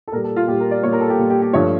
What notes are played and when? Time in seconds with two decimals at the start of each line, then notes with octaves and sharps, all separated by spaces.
0.08 A4
0.12 A#2 G3 A#4
0.24 A4
0.36 F4
0.48 A#2 G4
0.51 G3
0.60 A#4
0.71 D5
0.83 A#2 G3 C#5
0.93 A#4
1.01 A4
1.10 G4
1.18 A#2 G3
1.30 G4
1.42 G4
1.54 G2 F3 A3 C#5